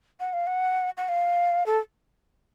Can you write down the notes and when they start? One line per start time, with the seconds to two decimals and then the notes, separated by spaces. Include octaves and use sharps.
0.20 F#5
0.33 F5
0.47 F#5
0.97 F#5
1.08 F5
1.66 A4